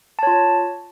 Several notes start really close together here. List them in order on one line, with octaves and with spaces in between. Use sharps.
A5 C#5 F4